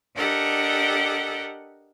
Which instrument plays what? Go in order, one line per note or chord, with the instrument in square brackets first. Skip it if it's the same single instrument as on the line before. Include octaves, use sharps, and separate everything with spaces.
[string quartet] D4 G4 A4 A#4 D#5 F#5